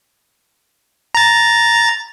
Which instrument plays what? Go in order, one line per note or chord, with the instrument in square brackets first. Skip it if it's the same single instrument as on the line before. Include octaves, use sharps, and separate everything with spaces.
[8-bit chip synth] A#5 A6